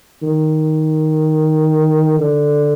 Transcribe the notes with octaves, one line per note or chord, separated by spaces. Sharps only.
D#3
D3